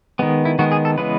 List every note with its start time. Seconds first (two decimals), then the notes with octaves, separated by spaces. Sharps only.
0.19 D#3 G#3 B3
0.45 E4
0.59 D#3 G#3 B3 F#4
0.72 G#4
0.85 A4
0.98 C#3 E3 G#3 B3 B4